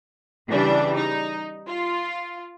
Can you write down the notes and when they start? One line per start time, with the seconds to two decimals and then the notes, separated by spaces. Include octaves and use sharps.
0.49 C#3 E3 G3 D4
0.96 D#4
1.67 F4